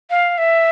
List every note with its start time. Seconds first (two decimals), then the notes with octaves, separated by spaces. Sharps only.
0.10 F5
0.38 E5